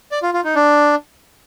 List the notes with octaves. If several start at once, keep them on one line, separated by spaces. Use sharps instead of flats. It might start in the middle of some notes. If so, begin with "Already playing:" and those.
D5
F4
F4
D#4
D4